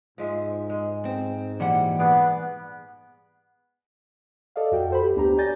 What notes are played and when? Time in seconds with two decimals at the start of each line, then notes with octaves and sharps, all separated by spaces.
0.18 G#2 F3 G#3 E5
0.70 G#3
1.05 C4
1.60 A#2 E3 G3 F#5
1.99 B3 G#4 D5
4.56 A4 D5 D#5 F5
4.71 F2 F#4 G5
4.90 A4 C5 B5
5.02 G4
5.15 D2 B3 D4 G4 A#5
5.37 C#5 D5 G#5 G6 A6 A#6